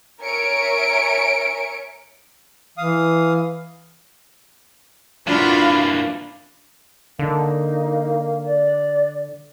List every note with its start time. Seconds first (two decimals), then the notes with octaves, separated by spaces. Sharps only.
0.22 A#4 C#5 E5 G#5 C#7 D7
2.78 E3 F5 D#6
5.27 E3 A#3 D4 F4 F#4 F5 B5
7.19 D3 A#3 D#4
8.45 D5